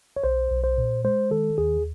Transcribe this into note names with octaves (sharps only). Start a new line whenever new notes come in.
C#5
B1 C5
B1
C5
A#2
G#3 C5
D#3 A4
D#2 G#4